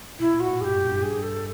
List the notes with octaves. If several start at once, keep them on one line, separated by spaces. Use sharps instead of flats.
B2 E4
A#2
F#4
A2
G2 G4 G#4
F#2
G2
G2 G#4
G2
A4